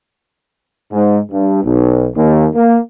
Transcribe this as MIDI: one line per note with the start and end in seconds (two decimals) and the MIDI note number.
0.92 1.18 44
1.31 1.63 43
1.64 2.07 35
2.15 2.47 39
2.54 2.77 58